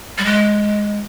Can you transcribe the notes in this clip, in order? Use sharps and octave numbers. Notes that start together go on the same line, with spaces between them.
G3
G#3